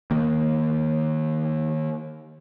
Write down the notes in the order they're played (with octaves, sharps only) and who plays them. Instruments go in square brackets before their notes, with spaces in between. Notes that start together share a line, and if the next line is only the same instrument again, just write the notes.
[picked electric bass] D#3 A#3